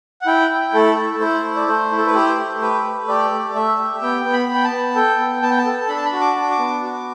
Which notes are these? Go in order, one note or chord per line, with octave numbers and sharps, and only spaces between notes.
F#5
E4 G5
E4
A3 A4
E4
E4 C5
A3
D5
A3 C5
E4
A4
B4
G4 C5
A3
G4 B4
A3
G4 D5
A3
A3 E5
G4
B3 G5
B3
B5
B3
G5
A5
B3
A4 G5
B3
B3 A5
G5
A5
A4
D4 B5
A5
B5
F#4
D6
D4
D6
B3
F#4